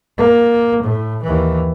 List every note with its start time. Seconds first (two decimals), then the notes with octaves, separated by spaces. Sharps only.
0.18 A#3
0.83 A2
1.23 D#2 E3